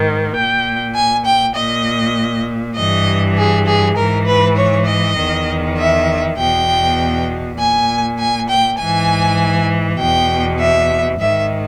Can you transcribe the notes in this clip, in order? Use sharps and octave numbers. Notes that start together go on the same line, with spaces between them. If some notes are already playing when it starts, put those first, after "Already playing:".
Already playing: G#2 D#3
A#2 G5
G#5
G5
A#2 D#5
G2 E3 D#5
G#4
G#4
G#2 E3 A#4
B4
C#5
D#5
E2 D#3
E5
E2 B2 G5
A#2 G#5
G#5
G5
G#2 E3 G#5
E2 B2 G5
E5
G#2 D#3 E5